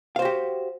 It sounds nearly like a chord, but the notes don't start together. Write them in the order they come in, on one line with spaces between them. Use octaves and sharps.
F5 C5 F#4 G4